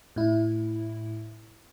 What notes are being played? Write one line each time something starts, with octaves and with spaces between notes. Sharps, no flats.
A2 E4